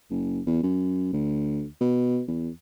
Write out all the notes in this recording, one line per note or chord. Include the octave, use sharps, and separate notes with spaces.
F#1
E2
F#2
D2
B2
E2